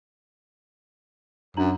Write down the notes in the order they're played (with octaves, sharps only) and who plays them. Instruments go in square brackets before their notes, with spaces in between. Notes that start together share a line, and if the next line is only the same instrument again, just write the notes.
[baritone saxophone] F#2 [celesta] D4 A#5 F#7